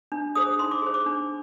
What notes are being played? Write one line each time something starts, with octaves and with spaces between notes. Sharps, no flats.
D4
G#4 C5 D#6
D#4 C6
D6
G#4 C5
D6
D4